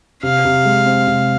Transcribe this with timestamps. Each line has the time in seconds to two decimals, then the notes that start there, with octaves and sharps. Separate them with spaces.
0.23 C3 F5
0.45 C3
0.65 G#3
0.86 C4
1.07 C3